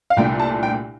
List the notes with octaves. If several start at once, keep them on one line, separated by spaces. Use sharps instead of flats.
F5
C2 A#2 A3 D4 G5
A5
G5